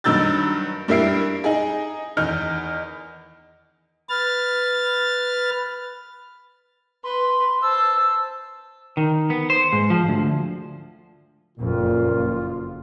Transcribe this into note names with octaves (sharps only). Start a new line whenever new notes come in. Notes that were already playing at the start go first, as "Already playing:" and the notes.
G2 D#3 F#3 E6 G6 A6
G2 G3 A#3 E4 C7 D7
D#4 G#4
E2 D#3 D#4 F6 G6
B4 F6 A6
B4 C6
C5 A5 E6
D#3
B3
C5
G#2
F3
D2
F#1 F2 A#2 F4